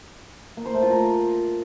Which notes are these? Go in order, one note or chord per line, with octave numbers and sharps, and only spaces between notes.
A#3
C5
A3
F4
A#4